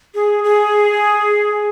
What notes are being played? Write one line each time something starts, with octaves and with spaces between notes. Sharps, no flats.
G#4
G#4